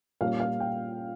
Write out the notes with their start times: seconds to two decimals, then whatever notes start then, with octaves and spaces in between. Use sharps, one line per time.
0.21 A#2 G3 A#3 C#4 F5
0.40 F5
0.60 G5